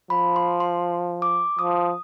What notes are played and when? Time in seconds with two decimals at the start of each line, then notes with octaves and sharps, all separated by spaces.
0.10 F3 B5
0.36 C6
0.60 C6
1.22 D6
1.59 F3 D#6